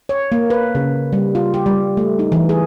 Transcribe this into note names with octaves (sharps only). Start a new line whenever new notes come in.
C#5
A#3
B4
C#3
G3
F4
G4
G3
A3
D#4
E3
G#4